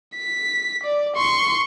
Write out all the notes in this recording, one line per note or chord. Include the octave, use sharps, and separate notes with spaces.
B6
D5
C6 C#6